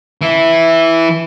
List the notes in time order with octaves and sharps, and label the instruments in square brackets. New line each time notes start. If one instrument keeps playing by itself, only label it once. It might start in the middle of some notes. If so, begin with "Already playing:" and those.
[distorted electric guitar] E3 E4